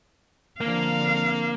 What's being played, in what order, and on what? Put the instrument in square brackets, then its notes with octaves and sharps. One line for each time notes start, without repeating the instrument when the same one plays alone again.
[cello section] D3 F3 C4 [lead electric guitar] A#3 [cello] F5